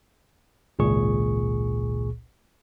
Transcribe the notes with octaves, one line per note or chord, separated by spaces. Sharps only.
G#1 C#2 A#2 G#4 C#6